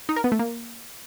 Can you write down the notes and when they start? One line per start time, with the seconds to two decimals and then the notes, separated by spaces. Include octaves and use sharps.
0.09 D#4
0.16 A#4
0.24 B3
0.32 A3
0.39 A#3